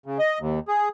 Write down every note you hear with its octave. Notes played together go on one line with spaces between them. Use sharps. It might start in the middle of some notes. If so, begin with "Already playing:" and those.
C#3
D#5
D#2
G#4